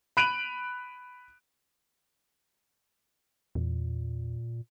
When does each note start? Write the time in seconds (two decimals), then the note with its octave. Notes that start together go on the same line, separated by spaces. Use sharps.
0.17 B5 F#6 D7 D#7 F7 F#7
3.55 E2 A#2